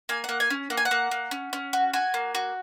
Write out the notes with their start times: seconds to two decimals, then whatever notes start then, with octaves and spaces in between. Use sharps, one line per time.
0.09 A#3 G#5
0.24 A#3 F#5
0.40 G#5
0.50 C#4
0.70 A#3 F#5
0.77 G#5
0.85 F#5
0.91 A#3
1.11 A#3
1.31 C#4
1.53 C#4
1.73 F#4
1.93 F#4 G#5
2.14 A#3
2.35 F#4